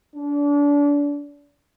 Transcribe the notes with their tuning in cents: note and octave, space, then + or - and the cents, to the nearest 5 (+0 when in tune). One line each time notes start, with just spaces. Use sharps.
D4 -30